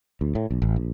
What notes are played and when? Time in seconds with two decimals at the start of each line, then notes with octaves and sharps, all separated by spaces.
0.21 D2
0.35 A2
0.51 B1
0.62 A1
0.76 A#1